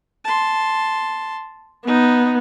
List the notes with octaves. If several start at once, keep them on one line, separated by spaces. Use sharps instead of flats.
A5 C6
B3 D#4